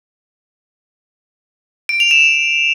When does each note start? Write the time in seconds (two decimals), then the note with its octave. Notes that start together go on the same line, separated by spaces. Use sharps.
1.89 D7
2.00 F7
2.11 E7